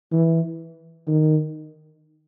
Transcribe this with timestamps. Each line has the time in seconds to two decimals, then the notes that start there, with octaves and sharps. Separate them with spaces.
0.12 E3
1.07 D#3